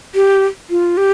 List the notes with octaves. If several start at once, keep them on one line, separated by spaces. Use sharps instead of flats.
G4
F4
G4